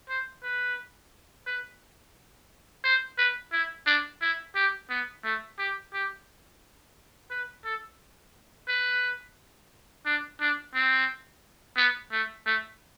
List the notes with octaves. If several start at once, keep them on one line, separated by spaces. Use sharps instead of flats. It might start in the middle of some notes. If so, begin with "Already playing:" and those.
C5
B4
B4
C5
B4
E4
D4
E4
G4
B3
A3
G4
G4
B4
A4
B4
D4
D4
C4
B3
A3
A3